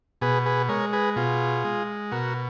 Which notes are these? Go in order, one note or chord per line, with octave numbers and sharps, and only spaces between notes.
B2 G#4 B4
G#4 B4
G#3 A#4 C#5
G#4 B4
B2 F4 G#4
G#3
B2 F#4 A#4